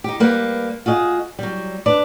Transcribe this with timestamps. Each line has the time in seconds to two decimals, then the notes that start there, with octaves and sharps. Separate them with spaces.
0.04 D#4 G4
0.20 G3 A#3 B4
0.86 F4 F#4 G#4 D#5
1.39 F#3 G3
1.86 D4 B4 D5